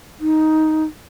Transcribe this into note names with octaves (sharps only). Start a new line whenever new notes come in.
D#4